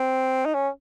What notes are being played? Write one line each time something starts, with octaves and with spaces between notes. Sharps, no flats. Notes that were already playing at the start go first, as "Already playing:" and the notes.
Already playing: C4
D#4
C#4